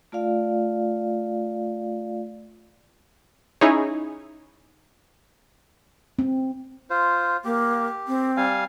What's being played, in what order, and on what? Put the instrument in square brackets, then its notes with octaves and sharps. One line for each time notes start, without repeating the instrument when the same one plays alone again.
[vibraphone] A3 F4 D5 F5
[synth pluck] C#4 D#4 E4 G#4 C#5
[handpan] C4
[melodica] F4 C5
[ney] A#3 [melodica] G4
[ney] C4
[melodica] G3 F5 G#5